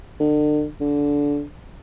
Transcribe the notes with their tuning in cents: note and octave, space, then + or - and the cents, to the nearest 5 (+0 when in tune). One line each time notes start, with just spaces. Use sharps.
D3 +35
D3 -20